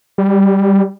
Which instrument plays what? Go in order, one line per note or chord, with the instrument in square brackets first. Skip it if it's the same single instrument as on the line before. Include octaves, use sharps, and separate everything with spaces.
[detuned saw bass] G3